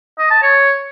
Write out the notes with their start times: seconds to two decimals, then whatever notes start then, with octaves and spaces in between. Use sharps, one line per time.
0.19 D#5
0.31 A5
0.42 C#5